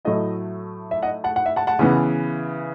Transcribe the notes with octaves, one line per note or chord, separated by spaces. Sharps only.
A2 F#3 A3 E4 D#5
E5
D#5 F#5
F#5 A5
F#5
E5
F#5 A5
F#5 A5
C#3 E3 B3